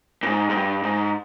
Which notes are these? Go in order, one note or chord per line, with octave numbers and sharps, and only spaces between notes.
A#2
G#2
G#2
G2
G#2